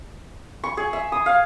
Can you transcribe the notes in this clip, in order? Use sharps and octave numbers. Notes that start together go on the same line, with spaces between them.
C#6
G#4
E5
D#6
F5